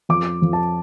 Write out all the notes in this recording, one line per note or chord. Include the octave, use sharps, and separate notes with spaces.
F2 D6
F2
A5